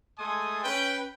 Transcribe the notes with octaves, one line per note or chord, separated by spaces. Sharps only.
G#3 A3 A4 G#5 C6 D#6
C#4 B4 G5